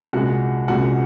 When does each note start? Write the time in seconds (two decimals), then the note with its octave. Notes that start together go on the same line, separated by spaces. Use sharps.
0.13 C2 A#2 G#3 F#4 F#5
0.68 C2 A#2 G#3 F#4 F#5